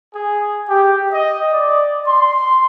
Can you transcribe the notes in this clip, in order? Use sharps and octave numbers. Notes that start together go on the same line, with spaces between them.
G#4
G4
D#5
D5
C6